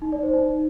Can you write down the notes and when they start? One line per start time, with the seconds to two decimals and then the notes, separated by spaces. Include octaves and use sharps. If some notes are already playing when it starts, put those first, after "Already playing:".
0.02 D#4
0.12 D5
0.23 C5
0.34 D#4